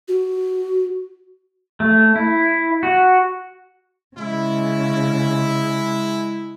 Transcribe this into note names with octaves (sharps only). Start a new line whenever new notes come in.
F#4
A3
E4
F#4
C#3 G#3 E4